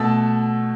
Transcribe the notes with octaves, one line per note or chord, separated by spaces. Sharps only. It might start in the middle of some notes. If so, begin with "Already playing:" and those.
Already playing: B2 A3 E6 A6